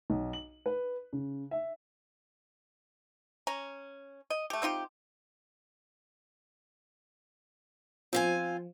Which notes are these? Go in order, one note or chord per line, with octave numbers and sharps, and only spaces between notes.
B1
F#7
B4
C#3
E5
C#4 A#5
D#5
A3 G4
C4 D#4 F4 G4
F3 C4 F4 G#5